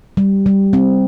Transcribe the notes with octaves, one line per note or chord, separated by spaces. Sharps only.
G3
G3
C4